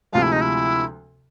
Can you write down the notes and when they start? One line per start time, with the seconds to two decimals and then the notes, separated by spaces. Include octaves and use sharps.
0.13 D2 C3 F3 G#3 F4
0.22 E4
0.32 D#4
0.41 E4